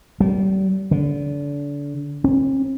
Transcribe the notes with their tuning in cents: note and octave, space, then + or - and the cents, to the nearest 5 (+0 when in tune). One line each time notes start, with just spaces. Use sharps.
G3 -35
D3 -30
C#4 -45